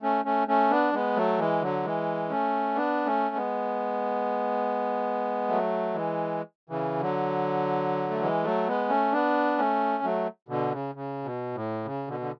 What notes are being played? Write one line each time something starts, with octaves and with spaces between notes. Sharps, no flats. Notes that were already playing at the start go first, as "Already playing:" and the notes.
A3 C#4
A3 C#4
A3 C#4
B3 D4
G#3 B3
F#3 A3
E3 G#3
D3 F#3
E3 G#3
A3 C#4
B3 D4
A3 C#4
G#3 B3
F#3 A3
E3 G#3
C#3 E3
D3 F#3
A3
E3 G#3
F#3 A3
G#3 B3
A3 C#4
B3 D4
A3 C#4
F#3 A3
B2 D3
C#3
C#3
B2
A2
C#3
B2 D3
D3